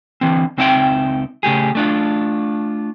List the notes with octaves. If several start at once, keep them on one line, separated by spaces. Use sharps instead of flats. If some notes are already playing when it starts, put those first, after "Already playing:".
D3 E3 C4
C#2 C4 D#4 E5 F#5 G5
C#3 A3 G4 G#4
A3 D4 F4